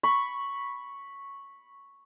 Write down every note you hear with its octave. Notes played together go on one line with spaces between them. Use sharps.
B5 C#6